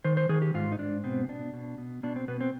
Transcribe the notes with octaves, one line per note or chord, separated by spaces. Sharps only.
D#3 C5
C5
D#3 G#4
G4
G#2 F4
D#4
G#2 D4
B2 C4
B2 D4
B2
B2
B2 D4
C4
B2 B3
C4